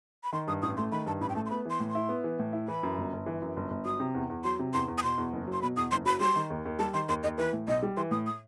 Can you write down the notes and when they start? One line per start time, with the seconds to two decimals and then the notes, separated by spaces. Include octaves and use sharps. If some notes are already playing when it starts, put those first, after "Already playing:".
0.24 B5
0.32 D#3 C6
0.47 G2 D#6
0.62 A1 D#6
0.77 A3 C6
0.92 D#3 B5
1.06 G2 A5
1.21 A1 B5
1.29 G5
1.35 A3 A5
1.46 C6
1.50 B3 B5
1.65 E3 C6
1.80 A2
1.90 C6
1.95 E4
2.09 B3
2.24 E3
2.39 A2
2.53 E4
2.68 E3 B5
2.83 F#2
2.98 G1
3.12 G1
3.26 E3
3.42 F#2
3.57 G1
3.70 G1
3.85 F#3 D#6
4.00 C3
4.15 E2
4.30 E2
4.44 F#3 C6
4.59 C3
4.73 E2 C6
4.88 E2
4.98 D#6
5.03 B2 C6
5.18 E2
5.33 F#1
5.47 F#3
5.53 C6
5.62 B2 B5
5.76 E2 D#6
5.91 F#1 C6
6.05 F#3 B5
6.20 G3 C6
6.36 D#3
6.50 D#2
6.65 D#2
6.79 G3 A5
6.94 D#3 C6
7.09 D#2 C6
7.23 D#2 D#5
7.38 E3 B4
7.53 A2
7.67 B1 D#5
7.83 G3
7.97 E3 C6
8.11 A2 D#6
8.26 D#6